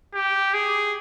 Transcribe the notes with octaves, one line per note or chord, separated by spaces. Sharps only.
G4
G#4